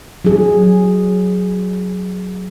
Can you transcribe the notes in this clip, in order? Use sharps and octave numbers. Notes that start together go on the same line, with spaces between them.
F#3 G#4